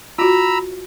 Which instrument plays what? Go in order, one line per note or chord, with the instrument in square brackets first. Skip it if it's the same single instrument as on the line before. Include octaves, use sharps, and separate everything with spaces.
[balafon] F4 F#4 [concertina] A#5 B5 E6